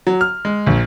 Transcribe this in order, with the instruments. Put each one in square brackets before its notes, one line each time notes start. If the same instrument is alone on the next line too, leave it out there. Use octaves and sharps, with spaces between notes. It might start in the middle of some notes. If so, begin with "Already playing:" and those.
[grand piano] F#3
F6
G#3
A#1